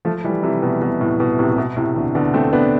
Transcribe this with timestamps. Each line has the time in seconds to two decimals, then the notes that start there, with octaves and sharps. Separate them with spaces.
0.05 F3 A3
0.24 E3 G3
0.43 C3 E3
0.63 B2
0.82 B2
1.01 A2
1.20 B2
1.39 A2 C3
1.53 C3
1.58 B2
1.77 A2 C3
1.96 B2 D3
2.15 B2 D3
2.34 A3 C4
2.53 B3 D4